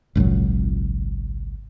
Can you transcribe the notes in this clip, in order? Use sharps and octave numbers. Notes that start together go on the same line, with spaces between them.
G#1 C#2 A#2 F#3